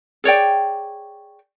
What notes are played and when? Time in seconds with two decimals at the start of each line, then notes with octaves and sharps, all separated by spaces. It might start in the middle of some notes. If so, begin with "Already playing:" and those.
0.24 G#4 C#5 D5 G5